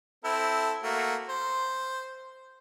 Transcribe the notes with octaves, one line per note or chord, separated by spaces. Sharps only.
C4 E4 A4
A3 A#3 F#4
C5